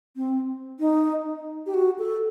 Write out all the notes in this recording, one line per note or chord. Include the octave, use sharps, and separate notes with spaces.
C4
D#4
G4
F#4
A4